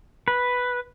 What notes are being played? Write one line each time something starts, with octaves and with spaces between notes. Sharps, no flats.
B4